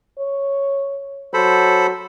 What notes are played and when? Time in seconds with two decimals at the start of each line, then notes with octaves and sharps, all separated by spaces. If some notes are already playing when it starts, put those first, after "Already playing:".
0.19 C#5
1.34 F#3 A4 C5 B5